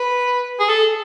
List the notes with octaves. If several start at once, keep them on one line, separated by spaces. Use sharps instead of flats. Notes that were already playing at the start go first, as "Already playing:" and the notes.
Already playing: B4
G#4
A4